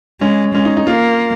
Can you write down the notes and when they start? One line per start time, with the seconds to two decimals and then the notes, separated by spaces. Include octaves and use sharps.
0.21 G#3 C#4
0.54 G#3 C#4
0.65 D#4
0.77 D#4
0.87 A#3 F4